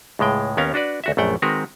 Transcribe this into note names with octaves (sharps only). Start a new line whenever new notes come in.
C#2 A2 G#3 G5
D#2 B3 C#4 A#4 F5
D4 F#4 B4 D5
D2 F#4 E5
A#1 F#2 A3 F#5 G5
D#3 G#3 C4 F#4 A#4 B4